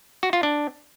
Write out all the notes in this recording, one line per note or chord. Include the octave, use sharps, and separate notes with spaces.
F#4
F4
D4